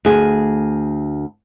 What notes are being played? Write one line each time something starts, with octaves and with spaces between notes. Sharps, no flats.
D2 G#4